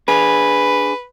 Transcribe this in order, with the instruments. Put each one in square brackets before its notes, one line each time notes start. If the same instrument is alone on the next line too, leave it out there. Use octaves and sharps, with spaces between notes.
[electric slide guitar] D4 G#4 [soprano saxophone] B4